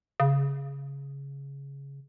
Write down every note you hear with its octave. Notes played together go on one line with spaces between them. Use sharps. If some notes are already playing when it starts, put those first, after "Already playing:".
C#3